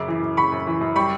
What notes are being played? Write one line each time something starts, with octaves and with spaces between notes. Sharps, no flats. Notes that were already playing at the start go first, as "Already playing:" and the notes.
Already playing: F#2 C#3 D6
E3
F#2
C#3 B5 C#6
F#2
E3
F#2
G3 B5 C#6